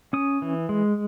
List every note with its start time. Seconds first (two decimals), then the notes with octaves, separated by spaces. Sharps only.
0.13 C#4 D#6
0.42 E3
0.69 G#3